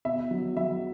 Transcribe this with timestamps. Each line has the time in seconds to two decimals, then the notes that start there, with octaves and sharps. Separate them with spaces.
0.05 B2 E5
0.31 F#3
0.57 F#3 E5